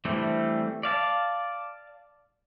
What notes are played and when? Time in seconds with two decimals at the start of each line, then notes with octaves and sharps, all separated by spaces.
0.05 E3 G3 A3 C4 D4
0.83 D5 F5 A5